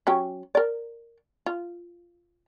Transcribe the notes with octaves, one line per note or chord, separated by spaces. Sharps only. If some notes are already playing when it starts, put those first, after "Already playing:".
F#3 C#4 G4
A#4 D5
F4